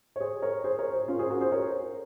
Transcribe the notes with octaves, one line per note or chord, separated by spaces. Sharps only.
C#5
G#4 C5
A#4 C#5
G#4 C5
A#4 C#5
G#4 C5
C#4 F4
G#4 C5
F#4 A#4
G#4 C5
A#4 C#5